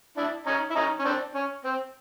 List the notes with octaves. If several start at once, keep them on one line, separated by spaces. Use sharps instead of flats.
D4 E4
C#4 D#4
E4
C#4 D#4
C#4
C4 D4
C#4
C4